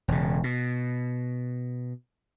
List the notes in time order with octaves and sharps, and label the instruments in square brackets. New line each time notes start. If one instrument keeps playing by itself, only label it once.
[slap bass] E1 C#3
B2